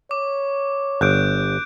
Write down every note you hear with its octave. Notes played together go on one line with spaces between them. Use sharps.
C#5 D6
G1 F#6 G6 D7